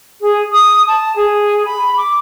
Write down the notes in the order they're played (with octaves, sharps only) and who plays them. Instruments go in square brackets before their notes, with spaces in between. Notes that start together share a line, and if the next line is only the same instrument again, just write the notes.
[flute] G#4
D#6
A5
G#4
B5
D6